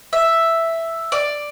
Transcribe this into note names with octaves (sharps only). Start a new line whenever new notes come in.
E5
D5